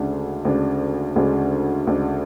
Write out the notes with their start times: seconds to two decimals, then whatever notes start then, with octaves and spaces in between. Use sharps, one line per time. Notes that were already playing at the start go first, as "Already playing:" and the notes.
Already playing: D2 C#3 G#3 D4
0.45 D2 C#3 G#3 D4
1.16 D2 C#3 G#3 D4
1.87 D2 C#3 G#3 D4